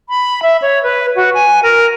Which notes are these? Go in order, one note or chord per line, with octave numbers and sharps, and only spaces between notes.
B5
E5
C#5
B4
F#4
G#5
A#4